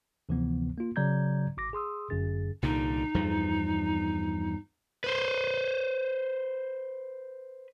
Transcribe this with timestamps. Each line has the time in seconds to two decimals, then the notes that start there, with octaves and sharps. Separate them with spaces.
0.29 D2 C3 E3 F3 B3
0.78 A#3 F4
0.96 C#3 F#3 D5 A#5 G6 G#6
1.57 G#1 D6 A#6
1.73 G#4 C6 D#6 E6
2.10 G1 F#2 D3 G#4 A6
2.63 C2 A#2 D3 D#4
3.14 E2 G2 F3
5.04 B4 C5